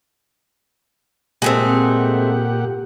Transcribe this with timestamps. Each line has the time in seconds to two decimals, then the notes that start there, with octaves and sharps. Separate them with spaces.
1.42 A#2 G#3 A3 C4 G4 F#5